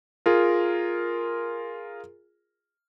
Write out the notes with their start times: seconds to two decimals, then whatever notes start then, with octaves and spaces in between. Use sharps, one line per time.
0.26 F4 G#4 A#4